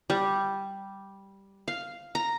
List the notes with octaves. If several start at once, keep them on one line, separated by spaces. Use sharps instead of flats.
G3
F5
A#5